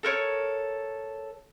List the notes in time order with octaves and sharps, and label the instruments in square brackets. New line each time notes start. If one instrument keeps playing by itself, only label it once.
[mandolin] A4 A#4 C5 C#5